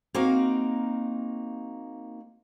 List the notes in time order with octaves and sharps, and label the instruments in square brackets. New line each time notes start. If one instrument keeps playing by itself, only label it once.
[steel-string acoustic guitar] A#3 C4 D#4 F#4 F5